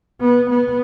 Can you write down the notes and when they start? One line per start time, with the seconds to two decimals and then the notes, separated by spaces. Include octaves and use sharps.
0.21 B3
0.50 B3